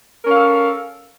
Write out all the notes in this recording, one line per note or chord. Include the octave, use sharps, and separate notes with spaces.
C#4 A4 A#4 F5